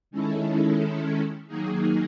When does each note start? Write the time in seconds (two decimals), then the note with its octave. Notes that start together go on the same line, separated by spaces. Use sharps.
0.11 D#3 G#3 C#4 E4 A4
1.47 D#3 F#3 A#3 D#4 G#4